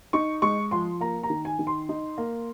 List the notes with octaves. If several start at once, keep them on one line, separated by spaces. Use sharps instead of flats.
D#4 C#6
G#3 C#6
F3 C6
A#3 A#5
A#5
D#3
G#5
D#3
C6
D#4
A#3